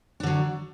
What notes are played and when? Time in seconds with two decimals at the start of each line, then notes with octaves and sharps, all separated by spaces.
0.20 D4
0.23 D3
0.27 F#3